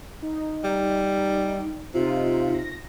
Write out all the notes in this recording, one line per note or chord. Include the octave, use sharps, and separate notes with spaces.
D#4
G3
C3 D#4 F4
A#6